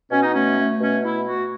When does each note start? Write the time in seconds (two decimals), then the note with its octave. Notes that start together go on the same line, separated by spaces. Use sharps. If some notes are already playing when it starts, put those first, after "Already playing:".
0.11 B2 C#4
0.22 D#4
0.34 A3 C#4
0.58 A3
0.81 B2 C#4
1.04 A3 E4
1.27 A3 F#4